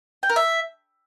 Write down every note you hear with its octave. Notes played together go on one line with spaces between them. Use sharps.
G5
A#4
E5